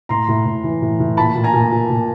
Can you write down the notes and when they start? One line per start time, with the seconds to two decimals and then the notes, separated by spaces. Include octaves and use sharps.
0.09 A2 A#5 C6
0.28 A2
0.45 A2
0.64 E3
0.82 A2
1.00 A2
1.17 A#2 A5 B5
1.35 A#2
1.44 G#5 A#5
1.53 A#2
1.71 A#2
1.90 A#2